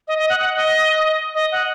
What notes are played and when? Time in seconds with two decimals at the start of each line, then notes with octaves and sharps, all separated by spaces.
0.08 D#5
0.18 D#5
0.29 F#5
0.40 F#5
0.56 D#5
1.35 D#5
1.52 F#5